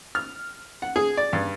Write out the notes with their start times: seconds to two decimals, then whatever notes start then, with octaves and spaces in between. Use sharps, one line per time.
0.15 F6
0.82 F#5
0.96 G#4
1.17 D5
1.33 G2